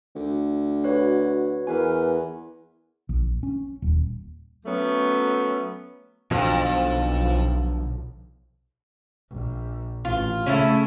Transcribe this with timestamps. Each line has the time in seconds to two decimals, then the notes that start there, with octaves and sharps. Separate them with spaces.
0.15 D2
0.84 F#4 B4 C#5
1.67 E2 A#4 B4 G#5
3.09 A#1
3.43 C#4
3.82 D#1
4.66 F#3 A3 B3 C#4
6.31 B1 F2 B2 D3 F3
9.30 A#1
10.05 A1 F4
10.46 C#3 A3 C#4 E4 A4